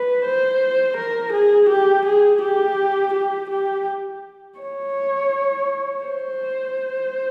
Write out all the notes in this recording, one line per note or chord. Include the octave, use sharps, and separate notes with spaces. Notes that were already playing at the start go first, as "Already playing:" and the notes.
Already playing: B4
C5
A#4
G#4
G4
G#4
G4
G4
G4
C#5
C5